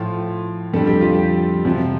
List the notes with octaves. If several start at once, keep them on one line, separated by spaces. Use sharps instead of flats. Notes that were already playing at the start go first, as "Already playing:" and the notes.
Already playing: A2 F3 F4
F2 D3 G3 A4
G4
F4
G4
F2 C3 F3